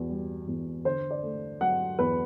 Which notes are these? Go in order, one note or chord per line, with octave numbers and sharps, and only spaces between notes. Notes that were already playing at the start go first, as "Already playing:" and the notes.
Already playing: E2 B2
G3
E2
D3 C5
D5
A3
F#3 F#5
E2 B4